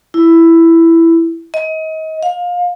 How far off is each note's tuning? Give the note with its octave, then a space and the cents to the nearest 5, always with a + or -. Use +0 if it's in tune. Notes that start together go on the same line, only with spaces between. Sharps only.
E4 +10
D#5 +30
F5 +25